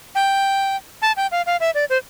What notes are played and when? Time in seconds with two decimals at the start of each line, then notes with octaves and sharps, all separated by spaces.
0.15 G5
1.02 A5
1.17 G5
1.32 F5
1.46 F5
1.60 E5
1.75 D5
1.90 C5